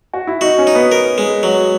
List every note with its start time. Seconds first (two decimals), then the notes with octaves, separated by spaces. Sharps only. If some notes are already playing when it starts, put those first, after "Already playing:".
0.14 F#4
0.27 E4
0.41 D#4 F#4
0.58 C#4
0.67 D#4
0.75 B3
0.92 A#4
1.18 G#3
1.43 F#3